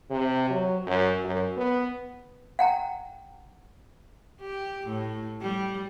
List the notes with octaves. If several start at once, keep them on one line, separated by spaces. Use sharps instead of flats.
C3
F#3
F#2
F#2
B3
F#5 G5 A#5
G4
A2
G3